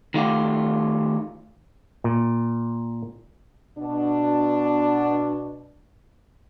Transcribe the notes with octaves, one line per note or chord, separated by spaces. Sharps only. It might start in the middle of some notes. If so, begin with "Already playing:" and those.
D#3 A3 F4 G4
A#2
B2 D4